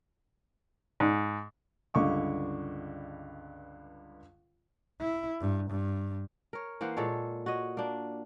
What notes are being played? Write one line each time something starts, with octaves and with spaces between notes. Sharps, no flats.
G#2
C#2 G2 D3 D#5 C#6 D6
E4
G2
G2
A#4 C#5
E3 A#3 C5 F#5
A#2 G#3 A4 C#5
F#4 C#5 D#5
A#3 D4